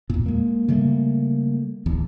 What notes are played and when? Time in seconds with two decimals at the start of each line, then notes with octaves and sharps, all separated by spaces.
0.10 E2 A#2
0.26 G#3 A#3
0.68 C#3 G3 A3 A#3
1.86 D1 E2